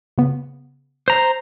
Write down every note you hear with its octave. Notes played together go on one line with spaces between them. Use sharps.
C#3 B3
C5 A#5